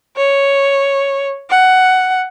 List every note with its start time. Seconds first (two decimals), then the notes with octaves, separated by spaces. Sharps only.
0.17 C#5
1.50 F#5